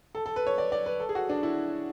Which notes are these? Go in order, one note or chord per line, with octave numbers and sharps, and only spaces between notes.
A4
A4
B4
C#5
D5
D5
B4
A4
G#4
F#4
D4
E4